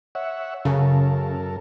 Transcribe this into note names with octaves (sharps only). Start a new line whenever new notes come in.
C#5 E5 F#5
F#2 C#3 A4 A#4